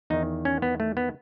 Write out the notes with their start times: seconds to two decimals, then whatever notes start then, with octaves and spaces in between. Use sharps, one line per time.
0.10 E2 D#3 D#4
0.45 C#4
0.62 B3
0.80 A3
0.97 B3